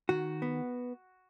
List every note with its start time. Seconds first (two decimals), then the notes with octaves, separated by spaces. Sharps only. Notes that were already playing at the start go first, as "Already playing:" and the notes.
0.09 D#3 F#4
0.42 B3